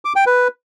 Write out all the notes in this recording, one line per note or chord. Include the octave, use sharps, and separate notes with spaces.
D6
G5
B4